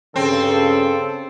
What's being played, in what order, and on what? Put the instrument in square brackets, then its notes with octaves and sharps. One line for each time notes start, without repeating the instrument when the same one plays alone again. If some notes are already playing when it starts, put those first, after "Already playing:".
[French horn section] G2 C#3 [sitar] C4 [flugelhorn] A4